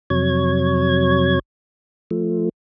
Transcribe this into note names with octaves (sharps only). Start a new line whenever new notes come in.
F2 C3 F#3 C#5 G#6
F3 A3